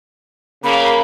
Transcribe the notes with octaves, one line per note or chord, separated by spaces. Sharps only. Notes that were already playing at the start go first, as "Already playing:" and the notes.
C#3 A#3 B5